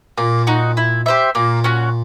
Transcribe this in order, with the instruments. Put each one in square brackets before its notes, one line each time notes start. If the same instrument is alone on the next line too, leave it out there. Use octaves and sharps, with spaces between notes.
[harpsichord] A#2 [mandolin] A#3
[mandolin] D#4 F#4
E4
G4 C5 E5
[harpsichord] A#2 [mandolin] A#3
[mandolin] C#4 F#4